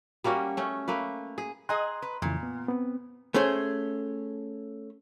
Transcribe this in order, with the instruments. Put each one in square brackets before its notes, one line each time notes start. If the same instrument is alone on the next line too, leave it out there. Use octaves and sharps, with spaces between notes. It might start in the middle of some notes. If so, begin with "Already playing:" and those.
[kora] G3 A#3 C#4 F#4
A3 C#4
A3 A#3 B4
G#4
[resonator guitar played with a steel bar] G#4 D#5 G#5 [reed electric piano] A#5 C6 F#6
[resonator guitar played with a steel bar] B4
[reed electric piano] F2 C#3 E3 [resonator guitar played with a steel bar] A#2
[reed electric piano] B3
B3 C4
[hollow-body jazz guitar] A3 C#4 G#4 C5